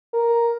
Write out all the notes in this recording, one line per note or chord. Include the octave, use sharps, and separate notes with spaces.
A#4